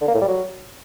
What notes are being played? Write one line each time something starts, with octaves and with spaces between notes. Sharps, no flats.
D3
A#3
A2
G3
F#3